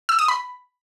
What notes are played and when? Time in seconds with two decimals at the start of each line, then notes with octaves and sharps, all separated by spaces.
0.09 E6
0.19 D#6
0.28 B5